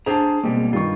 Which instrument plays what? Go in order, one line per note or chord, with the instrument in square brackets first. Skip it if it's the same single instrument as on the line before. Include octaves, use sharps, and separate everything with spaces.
[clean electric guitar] D4 C5 A#5 [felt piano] G#4 A5
[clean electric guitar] B2 G3 A#3 [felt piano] G#3 C4
[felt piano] G2 D#3 C#6 [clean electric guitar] F4